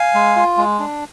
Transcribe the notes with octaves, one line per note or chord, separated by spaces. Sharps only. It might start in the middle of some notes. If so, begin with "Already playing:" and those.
Already playing: F5 G#5
G#3
F4
G#3
D4